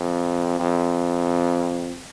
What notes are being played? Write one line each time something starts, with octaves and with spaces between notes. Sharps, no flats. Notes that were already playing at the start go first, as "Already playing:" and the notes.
Already playing: F2
F2